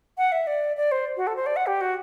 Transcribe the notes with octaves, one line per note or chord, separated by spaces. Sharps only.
F#5
E5
D5
D5
C5
F#4
A4
C5
D5
F#5
G4
F#4